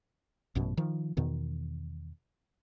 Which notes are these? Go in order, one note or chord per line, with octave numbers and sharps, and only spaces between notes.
A1 F#2 B2
D#3 F3
E2 B2 D#3